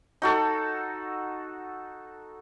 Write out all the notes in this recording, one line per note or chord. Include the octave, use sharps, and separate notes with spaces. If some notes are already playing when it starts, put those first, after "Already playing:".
D#4 F#4 A4